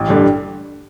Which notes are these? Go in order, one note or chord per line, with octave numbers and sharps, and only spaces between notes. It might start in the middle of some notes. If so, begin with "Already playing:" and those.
Already playing: A1
G2 D3 G3